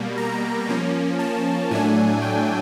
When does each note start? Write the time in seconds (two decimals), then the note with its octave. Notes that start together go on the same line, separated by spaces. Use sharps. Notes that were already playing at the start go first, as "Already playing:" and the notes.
Already playing: B2 G3 A#3
0.17 A#5
0.69 F3 A#3 C#4
1.19 A5
1.71 A2 F#3 A3 D4 G#5
2.22 G5